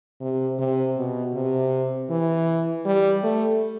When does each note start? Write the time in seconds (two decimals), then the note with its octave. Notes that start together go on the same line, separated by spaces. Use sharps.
0.21 C3
0.59 C3
0.97 B2
1.34 C3
2.10 E3
2.85 G3
3.23 A3